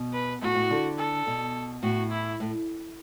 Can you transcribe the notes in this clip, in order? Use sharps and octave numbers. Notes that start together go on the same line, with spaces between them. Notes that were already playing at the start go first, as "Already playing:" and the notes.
Already playing: B2
B4
A2 F#4
A2
D3
A4
B2
A2 F#4
E4
A2